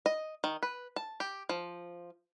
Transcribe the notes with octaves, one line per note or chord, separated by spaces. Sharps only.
D#5
D#3
B4
A5
G4
F3